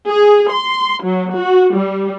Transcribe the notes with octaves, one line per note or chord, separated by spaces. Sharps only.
G#4
C6
F#3
F#4
G3